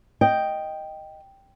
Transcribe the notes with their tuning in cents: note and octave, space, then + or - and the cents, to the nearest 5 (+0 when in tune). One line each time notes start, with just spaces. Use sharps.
D#5 +0 G5 +0